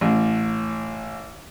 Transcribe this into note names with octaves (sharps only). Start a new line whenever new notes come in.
A1